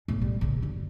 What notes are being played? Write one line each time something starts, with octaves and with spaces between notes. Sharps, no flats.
B1 A2
G3
A#1 C#3
F#2 D3